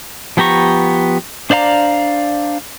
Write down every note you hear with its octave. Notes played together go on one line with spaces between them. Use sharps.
F3 B3 G4 A#5 C#6
D4 C5 D5 F5 A#5